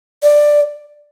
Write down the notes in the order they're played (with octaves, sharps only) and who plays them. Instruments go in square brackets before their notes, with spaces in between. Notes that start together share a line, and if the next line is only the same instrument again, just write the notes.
[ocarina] D5